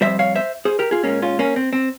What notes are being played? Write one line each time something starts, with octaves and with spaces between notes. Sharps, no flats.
F2 E3 G3 C5 E5
C#5 F5
C5 E5
G#4 C5
G4 A#4
F4 G#4
A#2 G#3 A#3 C#4
C#4 F4
A#3 C#4
C4
C4